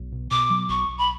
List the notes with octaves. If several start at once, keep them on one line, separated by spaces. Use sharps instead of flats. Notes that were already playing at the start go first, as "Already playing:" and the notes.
Already playing: B1
B2
B2 D6
F#3
B1 C#6
B1
B5